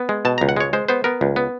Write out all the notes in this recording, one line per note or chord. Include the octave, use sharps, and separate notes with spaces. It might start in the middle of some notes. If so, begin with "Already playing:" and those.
Already playing: B3
G#3
B2 A5
C#2 A#5
F#5
G#3 C#5
G#3 C5
B3 C5
B3 A#4
C#2
B3